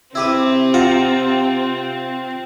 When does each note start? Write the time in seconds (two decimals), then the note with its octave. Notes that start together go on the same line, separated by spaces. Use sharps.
0.15 C3 C4 E4 G4 B4
0.74 F4 F5 F#5 A#5